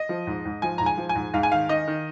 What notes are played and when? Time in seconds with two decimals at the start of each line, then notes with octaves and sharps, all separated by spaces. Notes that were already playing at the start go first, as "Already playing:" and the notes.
Already playing: D#5
0.09 F3
0.27 G#2
0.45 G#2
0.62 F3 G#5
0.78 G#2 A#5
0.86 G#5
0.98 F3
1.09 G#5
1.15 G#2
1.34 G#2 F5
1.43 G#5
1.52 D#3 F5
1.69 D#3 D#5
1.88 D#3